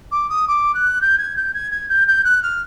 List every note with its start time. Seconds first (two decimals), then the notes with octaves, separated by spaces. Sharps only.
0.11 D6
0.29 D#6
0.47 D6
0.74 F#6
1.01 G6
1.18 G#6
1.36 G6
1.54 G#6
1.71 G#6
1.89 G6
2.07 G6
2.24 F#6
2.42 F6